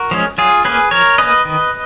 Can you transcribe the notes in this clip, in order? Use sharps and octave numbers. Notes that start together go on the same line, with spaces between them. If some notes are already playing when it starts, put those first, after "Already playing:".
Already playing: F#4 A#4
F3 G#3 C#4
F#3 F4 G#4
A#3 C#4 G#4 B4
F3 A#4 C#5
A#3 C#4 B4 D#5
D#3